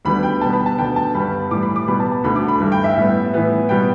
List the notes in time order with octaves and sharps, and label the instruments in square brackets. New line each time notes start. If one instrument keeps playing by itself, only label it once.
[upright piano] D2 D3 G3 B3 B5
G5
B2 G3 B3 A5
B5
A5
D2 D3 B3 G5
A5
G2 G3 B3 B5
A2 E3 G3 D6
B5
D6
B2 G3 B3 B5
A5
A5
D2 D3 A3 B5
D6
B5
G2 E3 A3
G5
E5
A2 G3 B3
A2 E3 B3
B2 G3 B3 G5